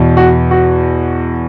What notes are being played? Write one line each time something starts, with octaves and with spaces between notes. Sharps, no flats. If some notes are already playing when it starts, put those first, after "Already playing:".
Already playing: E2 B2
F#4
F#4